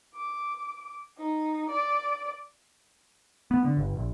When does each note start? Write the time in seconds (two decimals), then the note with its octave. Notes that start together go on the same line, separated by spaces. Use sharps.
0.15 D6
1.18 D#4
1.70 D5
3.51 B3
3.65 D3
3.77 G1
3.96 A#1